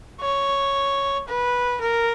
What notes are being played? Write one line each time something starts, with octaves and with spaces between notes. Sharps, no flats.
C#5
B4
A#4